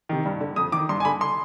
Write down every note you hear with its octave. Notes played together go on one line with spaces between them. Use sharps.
C3 D#3
G2
D3
F2 D#6
D#3 D6
G2 C6
G#5
D3 B5
C6